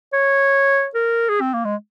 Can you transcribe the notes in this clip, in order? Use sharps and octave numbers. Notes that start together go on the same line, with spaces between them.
C#5
A#4
G#4
C4
A#3
G#3